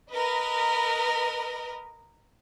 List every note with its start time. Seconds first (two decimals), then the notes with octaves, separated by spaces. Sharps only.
0.10 A#4 B4 D#5